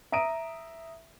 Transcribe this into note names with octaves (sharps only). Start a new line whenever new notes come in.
E5 A#5 D#6 D7 D#7